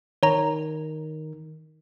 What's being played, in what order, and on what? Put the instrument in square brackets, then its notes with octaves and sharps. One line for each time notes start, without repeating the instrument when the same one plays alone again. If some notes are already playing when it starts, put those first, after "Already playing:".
[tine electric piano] D#3 [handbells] C#5 A#5